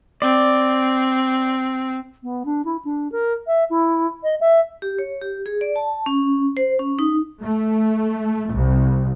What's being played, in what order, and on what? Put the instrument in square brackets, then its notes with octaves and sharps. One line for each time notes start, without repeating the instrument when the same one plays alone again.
[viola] C4 [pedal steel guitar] D5
[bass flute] B3
D4
E4
D4
A#4
E5
E4
D#5
E5
[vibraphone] G4
C#5
G4
G#4
D5
A5
C#4
C5
C#4
D#4
[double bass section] A3
C2